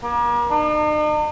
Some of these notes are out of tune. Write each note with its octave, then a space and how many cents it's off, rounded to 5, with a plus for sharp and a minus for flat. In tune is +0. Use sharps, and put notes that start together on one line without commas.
A#3 +40
D#4 -45